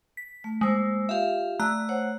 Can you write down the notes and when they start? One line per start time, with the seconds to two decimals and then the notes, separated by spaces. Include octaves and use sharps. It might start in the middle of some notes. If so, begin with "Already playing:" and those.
0.17 B6
0.44 A3
0.61 G#3 A#3 C5 E6
1.09 F4 G4 E5 F5
1.60 A3 D5 A#5 F#6
1.89 C5 C#5 F#5